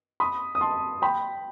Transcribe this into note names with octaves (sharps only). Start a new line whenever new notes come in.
B5 D#6
D#6
A5 C6
G5 B5